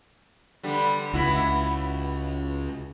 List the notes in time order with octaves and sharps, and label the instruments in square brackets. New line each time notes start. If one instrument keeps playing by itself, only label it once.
[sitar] D3 G3 B3
[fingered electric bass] C#2 [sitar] B3 E4 F#4